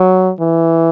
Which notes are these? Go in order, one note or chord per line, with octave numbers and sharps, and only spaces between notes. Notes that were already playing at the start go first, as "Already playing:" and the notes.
Already playing: F#3
E3